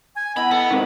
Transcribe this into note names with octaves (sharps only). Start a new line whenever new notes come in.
G#5
B3 E4 D#5 B5
B3 A4
G#2 C3 D#3